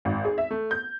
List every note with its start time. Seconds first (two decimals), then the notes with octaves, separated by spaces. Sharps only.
0.05 G#1
0.25 G#4
0.38 E5
0.51 A3
0.71 G6